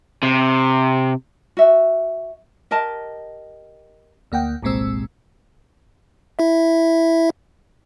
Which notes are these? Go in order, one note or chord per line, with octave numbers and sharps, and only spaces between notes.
C3
F#4 E5
G4 A#4 D#5 A5
D2 A#3 F#5 G5
G1 C2 A#2 G#3 C4 E6
E4 E5